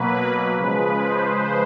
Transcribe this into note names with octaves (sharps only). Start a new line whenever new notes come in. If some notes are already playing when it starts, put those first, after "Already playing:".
Already playing: B2 F#3 A#3 B4
C#3 F3 G#3 B4
C5